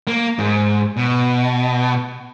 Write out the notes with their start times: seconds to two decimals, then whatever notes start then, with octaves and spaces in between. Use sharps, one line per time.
0.07 A#3
0.38 G#2
0.97 B2